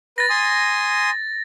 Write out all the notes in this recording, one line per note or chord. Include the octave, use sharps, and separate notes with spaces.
B4 A6 A#6
G#5 C6 D#6